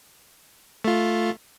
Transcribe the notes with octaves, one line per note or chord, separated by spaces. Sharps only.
A3 F4